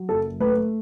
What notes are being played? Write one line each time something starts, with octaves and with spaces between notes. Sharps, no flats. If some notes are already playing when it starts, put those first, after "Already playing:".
Already playing: F#3
F#1 A4
A3 B4